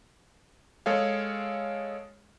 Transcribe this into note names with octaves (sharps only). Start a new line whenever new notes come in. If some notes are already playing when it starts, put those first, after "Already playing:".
G#3 G#4 A4 C#5 F5